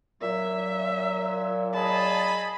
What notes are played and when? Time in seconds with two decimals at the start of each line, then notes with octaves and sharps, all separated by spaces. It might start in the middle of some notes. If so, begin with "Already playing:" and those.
0.21 A#2 F#3 E5
1.74 G#4 D#5 A5 B5